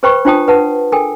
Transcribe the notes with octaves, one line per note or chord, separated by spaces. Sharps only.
G#4 B4 C5 G5 B5 C#6
D4 F4 C5 G5 A5 D#6
B4 F#5 A5
A4 A#4 G5 G#5